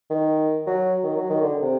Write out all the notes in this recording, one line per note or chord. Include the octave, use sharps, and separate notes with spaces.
D#3
F#3
D#3
F#3
D#3
D3
C3